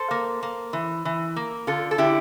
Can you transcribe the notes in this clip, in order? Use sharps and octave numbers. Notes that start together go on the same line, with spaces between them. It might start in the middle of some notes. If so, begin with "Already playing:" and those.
Already playing: A4 C5
A#3
A#3
E3
E3
A#3
D3 F4 A4
A4
D3 E4 G4